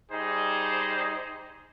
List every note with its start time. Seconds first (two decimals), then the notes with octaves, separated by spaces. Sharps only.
0.12 G3 D#4 G#4 C5